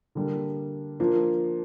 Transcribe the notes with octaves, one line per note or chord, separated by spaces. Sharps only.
D3 G3 A#3 D4
F3 A#3 D4 F4